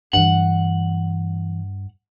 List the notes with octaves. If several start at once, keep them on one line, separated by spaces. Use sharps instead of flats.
G2 D3 E3 F#5